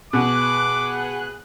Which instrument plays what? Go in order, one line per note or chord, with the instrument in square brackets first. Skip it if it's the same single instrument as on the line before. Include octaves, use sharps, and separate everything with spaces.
[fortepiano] B2 [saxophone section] B3 G#4 [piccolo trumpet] D6 [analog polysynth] F#6